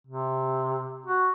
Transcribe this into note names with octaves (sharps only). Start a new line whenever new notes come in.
C3
F#4